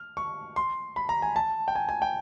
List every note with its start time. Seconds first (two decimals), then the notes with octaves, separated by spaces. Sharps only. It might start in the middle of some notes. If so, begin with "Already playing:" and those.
Already playing: F6
0.17 C#6
0.56 C6
0.96 B5
1.09 A#5
1.22 G#5
1.36 A5
1.68 G5
1.75 G#5
1.89 G#5
2.02 G5